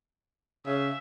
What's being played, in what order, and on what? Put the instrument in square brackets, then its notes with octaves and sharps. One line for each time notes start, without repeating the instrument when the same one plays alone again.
[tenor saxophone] C#3 [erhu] E5